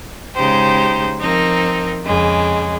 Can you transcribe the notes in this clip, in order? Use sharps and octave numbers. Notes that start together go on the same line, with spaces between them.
C#3 G#3 D#4 G4 C5
F3 C4 D#4 A#4
F2 C#3 G#3